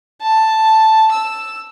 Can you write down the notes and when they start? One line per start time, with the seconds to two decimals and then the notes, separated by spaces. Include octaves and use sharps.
0.22 A5
1.12 E6